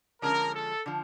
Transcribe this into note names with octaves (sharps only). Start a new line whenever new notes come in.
D3 F3 G#3 C#4 A#4
A4
D3 F3